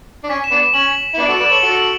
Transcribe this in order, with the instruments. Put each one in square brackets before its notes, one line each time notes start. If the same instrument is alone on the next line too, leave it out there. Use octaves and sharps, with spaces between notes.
[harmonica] D4
[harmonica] C#4 [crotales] B6
[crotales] E7
[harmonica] B3 D4
[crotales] E7
[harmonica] C#4 [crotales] F#7
[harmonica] E4
B3 D4
[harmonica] F#4 A4 [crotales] D7
[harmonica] B4 D5 [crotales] E7
[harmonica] A4 C#5 [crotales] F#7
[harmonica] F#4 A4 [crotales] G7
[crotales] F#7